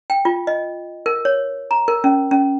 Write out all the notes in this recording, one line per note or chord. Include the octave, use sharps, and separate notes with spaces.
G5
F4
D#5
A#4
C#5
A#5
A#4
C#4
C#4